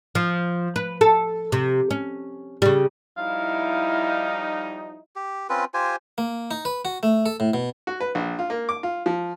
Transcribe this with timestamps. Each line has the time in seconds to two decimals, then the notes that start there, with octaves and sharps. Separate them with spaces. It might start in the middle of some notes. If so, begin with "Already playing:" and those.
0.15 F3
0.76 B4
1.01 A4
1.52 C3
1.91 C#4
2.62 C#3 G3
3.18 F3 G3 D#4 E4 F5
5.16 G4
5.50 C4 C#4 F4 B4
5.74 F4 G4 C5 G#5
6.18 A#3
6.51 D#4
6.65 B4
6.85 F#4
7.03 A3
7.26 A4
7.40 A2
7.54 B2
7.87 F#4
8.00 B4
8.15 A#1
8.39 F4
8.50 A#3
8.69 D6
8.83 F4
9.06 F3